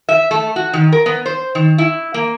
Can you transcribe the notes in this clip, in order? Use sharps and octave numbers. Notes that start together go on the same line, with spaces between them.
E5
A3
F#4
D#3
A#4
B3
C5
D#3
E4
A#3